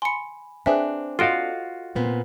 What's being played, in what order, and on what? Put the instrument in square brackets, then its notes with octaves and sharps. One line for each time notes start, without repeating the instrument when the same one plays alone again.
[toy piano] G#5 B5 [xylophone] C6 C#7
[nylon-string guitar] C4 D4 [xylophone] G#4 B4 E5 [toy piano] C5 G5 G#5
[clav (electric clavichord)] F4 F#4 F5 [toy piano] A4 D#5 [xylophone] C6 D7
[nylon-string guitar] A#2 B3 C4